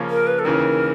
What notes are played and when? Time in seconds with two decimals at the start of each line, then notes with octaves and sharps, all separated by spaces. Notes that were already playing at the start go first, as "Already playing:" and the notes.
Already playing: C#3 F3 A#3 C#4
0.10 A#4
0.27 B4
0.39 A4
0.45 D#2 C#3 E3 A#4